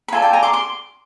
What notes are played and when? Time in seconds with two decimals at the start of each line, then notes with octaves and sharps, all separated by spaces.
0.08 B5
0.12 F4 A4 D5 G#5 A#5
0.22 G5 A5
0.33 G#5 A#5
0.43 C6 D6
0.53 C6 D6